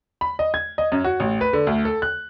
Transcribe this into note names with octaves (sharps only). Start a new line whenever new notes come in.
B5
D#5
G#6
D#5
F#2
F#4
A1
B4
D3
D2
A4
F#6